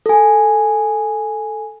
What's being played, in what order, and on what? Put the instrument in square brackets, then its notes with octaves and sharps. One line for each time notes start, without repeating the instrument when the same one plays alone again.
[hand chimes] A4 G#5